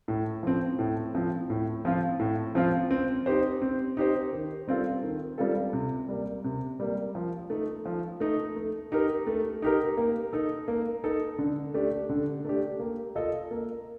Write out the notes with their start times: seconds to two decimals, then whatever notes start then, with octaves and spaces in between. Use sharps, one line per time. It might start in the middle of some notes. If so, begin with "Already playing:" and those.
0.08 A2
0.43 F3 C4
0.79 A2
1.15 F3 C4
1.50 A2
1.85 F3 C4 F4
2.20 A2
2.55 F3 C4 F4
2.91 C4
3.26 D#4 G4 C5
3.62 C4
3.97 D#4 G4 C5
4.32 D#3
4.67 G3 C4 F4 A4
5.03 D#3
5.38 G3 C4 F4 A4
5.73 C3
6.09 G3 A#3
6.44 C3
6.80 G3 A#3
7.15 F3
7.50 A3 D#4
7.86 F3
8.20 A3 D#4
8.56 A3
8.92 D#4 G4 A#4
9.27 A3
9.62 D#4 G4 A#4
9.97 A#3
10.33 D#4 A4
10.68 A#3
11.04 D#4 A4
11.39 D3
11.74 A3 D4 G4
12.09 D3
12.45 A3 D4 G4
12.79 A#3
13.15 F4 A4 D#5
13.51 A#3